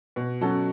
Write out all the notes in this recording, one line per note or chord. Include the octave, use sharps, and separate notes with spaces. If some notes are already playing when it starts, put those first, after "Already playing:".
B2
F#3 C#4 F#4 A4